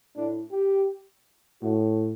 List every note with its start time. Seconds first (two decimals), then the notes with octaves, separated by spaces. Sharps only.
0.16 A2 D4
0.52 G4
1.62 A2 F#4